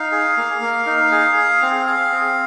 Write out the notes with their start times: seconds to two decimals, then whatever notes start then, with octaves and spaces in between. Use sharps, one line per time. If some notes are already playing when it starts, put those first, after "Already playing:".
Already playing: D#4 F5
0.12 G#4
0.37 A#3
0.62 A#3
0.86 D#4
1.12 G#4
1.37 G#4
1.62 C4
1.86 G#4 F5
2.11 C4